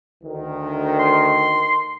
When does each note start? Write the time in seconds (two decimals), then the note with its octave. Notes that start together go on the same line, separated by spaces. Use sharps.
0.24 D2 D#3
1.00 C6